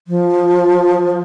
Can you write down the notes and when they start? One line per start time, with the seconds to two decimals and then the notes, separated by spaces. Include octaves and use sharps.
0.08 F3